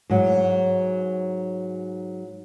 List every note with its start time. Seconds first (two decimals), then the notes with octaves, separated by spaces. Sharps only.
0.10 G#2 F#3